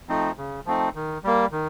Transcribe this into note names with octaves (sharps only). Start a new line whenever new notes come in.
F3 A3 C4 D#4
C#3
F3 A3 C4 D#4
D#3
G3 A#3
D#3